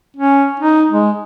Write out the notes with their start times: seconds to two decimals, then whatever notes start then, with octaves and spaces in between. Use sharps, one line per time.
0.17 C#4
0.60 D#4
0.90 G#3